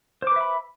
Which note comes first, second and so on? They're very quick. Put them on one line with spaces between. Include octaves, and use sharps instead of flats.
C5 D6 B4 E5 B5